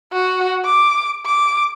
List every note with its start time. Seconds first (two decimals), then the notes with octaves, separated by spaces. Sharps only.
0.12 F#4
0.65 D6
1.26 D6